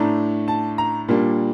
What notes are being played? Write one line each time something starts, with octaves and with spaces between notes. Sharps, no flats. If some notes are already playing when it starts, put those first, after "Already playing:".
Already playing: A2 A3 D4 A#5
A5
A#5
A#2 G3 A#3 D4